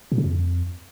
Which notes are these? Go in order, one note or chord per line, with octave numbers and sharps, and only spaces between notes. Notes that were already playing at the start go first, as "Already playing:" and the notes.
B2
C#3
F2